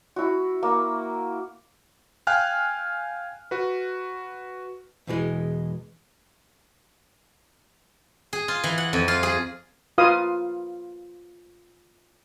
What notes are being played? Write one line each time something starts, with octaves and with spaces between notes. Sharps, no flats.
E4 F#4
A#3
F5 G5 G#5 F6 F#6
F#4 B4
E2 B2 E3 G#3
G#4
F4
E3
F#5
F2
F4
G#4
F4 B4 F5 D#6